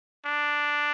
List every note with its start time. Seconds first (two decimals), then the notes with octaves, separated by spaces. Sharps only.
0.26 D4